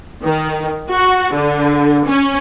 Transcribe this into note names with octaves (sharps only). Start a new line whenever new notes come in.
D#3
F#4
D3
C#4